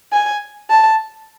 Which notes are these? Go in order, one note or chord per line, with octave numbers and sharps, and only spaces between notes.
G#5
A5